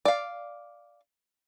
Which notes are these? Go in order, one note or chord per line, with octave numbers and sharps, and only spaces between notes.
D5 F5